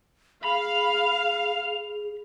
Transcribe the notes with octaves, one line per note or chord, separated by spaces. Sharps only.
G#4 F5 B5 F7